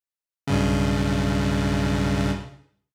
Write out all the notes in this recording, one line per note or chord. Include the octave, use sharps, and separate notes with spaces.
B1 G2 C#3